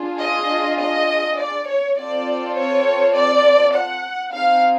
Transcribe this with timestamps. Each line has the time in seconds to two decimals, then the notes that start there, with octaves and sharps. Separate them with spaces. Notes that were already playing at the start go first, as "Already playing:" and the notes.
Already playing: D4 F4 G#4
0.21 D#5
0.79 D#5
1.38 D5
1.68 C#5
1.97 C4 F4 A4 D5
2.56 C#5
3.15 D5
3.74 F#5
4.33 C4 D#4 G#4 F5